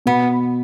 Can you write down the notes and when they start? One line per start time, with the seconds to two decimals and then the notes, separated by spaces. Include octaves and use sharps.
0.06 B2 B3